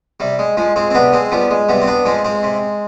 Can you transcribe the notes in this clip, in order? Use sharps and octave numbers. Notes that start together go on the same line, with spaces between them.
C3 G3
G#3
F3 G#3
G#3 C4
C4
C3 B3 D4
G#3 C4
F3 G3 B3
G#3
C3 G3 B3
C4
B3 D4
F3 G#3 C4
G#3 C4
C3